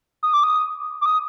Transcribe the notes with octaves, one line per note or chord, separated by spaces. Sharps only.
D#6
D6
D#6
D6
D#6